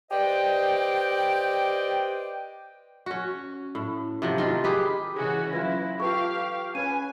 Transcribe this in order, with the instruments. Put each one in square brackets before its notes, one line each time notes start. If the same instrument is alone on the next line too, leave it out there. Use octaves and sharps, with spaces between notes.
[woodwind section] G4 B4 C5 D5 D#5 G5
[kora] C#4 F#4
A2
C3 F3 F#3
D#3 F4
G4 G#4 B4
[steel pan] C#3 G#4 [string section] E3 C#4 F#4
[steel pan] F#3 F4 B4 [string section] E4 [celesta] A#6
[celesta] F4 B4 C#6 [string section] G4 F5 [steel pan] A4
[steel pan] C#4 B4 [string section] G#5 [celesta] D#7